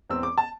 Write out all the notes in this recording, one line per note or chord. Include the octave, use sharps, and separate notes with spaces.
E1 E2 E3 C4 E6
D6
A5